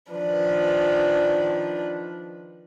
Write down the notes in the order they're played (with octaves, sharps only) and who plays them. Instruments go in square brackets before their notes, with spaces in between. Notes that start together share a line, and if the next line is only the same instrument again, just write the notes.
[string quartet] D#3 F3 D4 B4